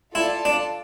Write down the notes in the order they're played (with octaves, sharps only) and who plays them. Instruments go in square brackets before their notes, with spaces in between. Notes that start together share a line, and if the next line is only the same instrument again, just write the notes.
[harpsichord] E4 [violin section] F4 A4 D5 A5
[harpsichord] D4